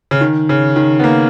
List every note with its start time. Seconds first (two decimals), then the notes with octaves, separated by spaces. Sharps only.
0.11 C#3
0.21 D#3
0.49 C#3
0.76 D#3
1.00 B3
1.04 A#3